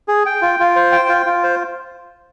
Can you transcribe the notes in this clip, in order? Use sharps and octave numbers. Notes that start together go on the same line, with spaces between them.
G#4
G5
F4
F4
C5
G5
F4
F4
C5